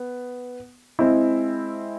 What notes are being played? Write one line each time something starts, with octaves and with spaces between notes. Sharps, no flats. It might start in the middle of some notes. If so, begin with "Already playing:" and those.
Already playing: B3
G#3 C4 E4